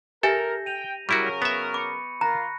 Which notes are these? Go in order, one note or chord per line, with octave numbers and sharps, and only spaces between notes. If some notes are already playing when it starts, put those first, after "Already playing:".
G4 A4 A#4 E5 G#5 G6 A#6
G5 D#7 F7
C#3 F#3 G3 E4 F#4 A#4 C#6 D#7
B3 E5
B5 D6 C#7
A#3 F4 A#5 B5 F#6 A#6